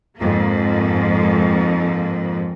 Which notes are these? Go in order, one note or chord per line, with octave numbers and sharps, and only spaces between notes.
F2 G#2 A#3